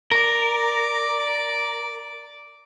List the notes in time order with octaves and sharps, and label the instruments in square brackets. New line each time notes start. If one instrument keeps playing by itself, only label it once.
[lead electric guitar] A#4 [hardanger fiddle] D5